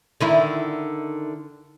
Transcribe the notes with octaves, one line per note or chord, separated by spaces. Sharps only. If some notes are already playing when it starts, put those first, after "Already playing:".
D3 D#3 E4